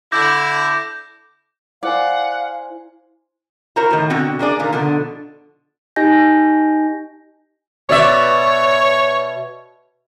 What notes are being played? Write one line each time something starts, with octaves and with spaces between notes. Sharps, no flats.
D3 E4 D6 G6 A#6
E4 C5 D5 F5 F#5 G#5
E4 F#4 A#4 C5 C#5 A#5
A2 D#3
B2 D3 C4 F#4 G5
A#3 D4 G#4 D5
A#2 D#3 A#3
B2 D3 F3 D4
D#4 G4 D#5 G#5 G6 A#6
B2 C#5 D5 E5